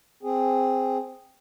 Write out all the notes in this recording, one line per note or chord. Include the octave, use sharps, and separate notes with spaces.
C4 G#4